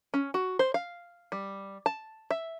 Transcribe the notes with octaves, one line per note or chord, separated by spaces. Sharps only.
C#4
F#4
C5
F5
G3
A5
E5